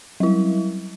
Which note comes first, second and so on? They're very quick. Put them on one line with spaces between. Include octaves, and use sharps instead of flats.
F#3 E4 G3